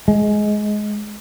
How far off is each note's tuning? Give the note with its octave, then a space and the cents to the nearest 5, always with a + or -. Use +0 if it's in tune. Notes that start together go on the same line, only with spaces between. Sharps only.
G#3 +15